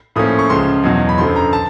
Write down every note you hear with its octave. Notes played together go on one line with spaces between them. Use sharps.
A2 F3 A#3 C#4 D#6
C#6
C#2 C#3 F3 C6
E2 B2 F#3
B5
F#2 D3 F3 C6
A#5
A5